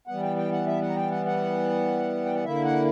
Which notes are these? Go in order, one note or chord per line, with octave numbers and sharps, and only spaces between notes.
E3 G3 B3 F#5
G5
G5
F#5
E5
F#5
A#5
G5
F#5
F#5
G5
F#5
D3 A#3 E4 E5
F#5